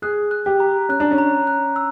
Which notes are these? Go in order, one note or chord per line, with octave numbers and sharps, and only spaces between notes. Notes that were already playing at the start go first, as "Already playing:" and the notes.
G#4 F#6
F#6
G4
A#5
C#4 F#6
D4
C#4
A#5
F#6
E6